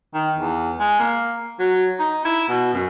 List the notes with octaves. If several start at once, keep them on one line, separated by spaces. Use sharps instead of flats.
D#3
E2
G#3
A#3
F#3
D#4
E4
B2
F#2